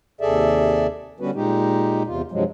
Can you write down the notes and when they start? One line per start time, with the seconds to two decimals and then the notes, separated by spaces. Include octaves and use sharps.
0.21 D#2 C3 G#4 A4 D5 E5
1.20 D3 G3 B3 C#4 F#4 B4
1.35 A#2 G#3 D#4 G4
2.07 E2 C3 F4
2.32 G2 C3 F3 F#3 G#3